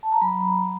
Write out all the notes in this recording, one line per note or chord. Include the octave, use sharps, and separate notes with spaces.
A5
A#5
F#3 B5